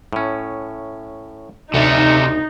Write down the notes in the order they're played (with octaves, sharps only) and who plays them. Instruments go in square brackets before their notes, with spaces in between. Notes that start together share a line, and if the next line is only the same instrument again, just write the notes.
[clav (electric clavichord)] A2 C#4
[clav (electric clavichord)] D2 A5 [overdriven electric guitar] C3 A3 [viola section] D#4